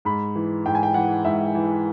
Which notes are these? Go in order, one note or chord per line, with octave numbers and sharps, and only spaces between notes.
G#2 B5
E3
G#2 G5
G#5
G5
E3 F#5
G#2 E5
E3